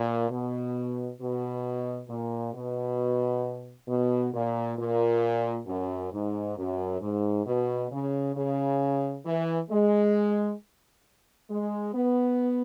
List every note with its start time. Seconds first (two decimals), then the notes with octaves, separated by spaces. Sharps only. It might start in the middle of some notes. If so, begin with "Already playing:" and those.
Already playing: A#2
0.30 B2
1.20 B2
2.09 A#2
2.54 B2
3.88 B2
4.33 A#2
4.78 A#2
5.67 F#2
6.12 G#2
6.57 F#2
7.01 G#2
7.46 B2
7.91 C#3
8.35 C#3
9.26 E3
9.70 G#3
11.49 G#3
11.94 B3